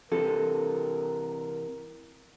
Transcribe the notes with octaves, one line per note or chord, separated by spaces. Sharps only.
C3 E3 A4 A#4